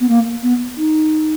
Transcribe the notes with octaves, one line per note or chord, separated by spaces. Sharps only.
B3
A#3
B3
D#4